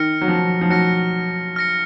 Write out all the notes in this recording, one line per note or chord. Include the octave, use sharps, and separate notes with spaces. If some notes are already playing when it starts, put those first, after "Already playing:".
Already playing: D#3 F6 A#6 C#7
F#3
F3
F3
F#3 F6 A#6 C#7
F6 A#6 C#7